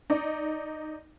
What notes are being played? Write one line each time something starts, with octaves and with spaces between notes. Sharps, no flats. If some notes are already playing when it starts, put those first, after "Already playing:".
D#4 D5